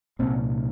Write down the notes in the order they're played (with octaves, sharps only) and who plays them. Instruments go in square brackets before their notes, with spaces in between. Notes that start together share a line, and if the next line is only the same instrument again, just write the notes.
[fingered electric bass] C2 A#2 C4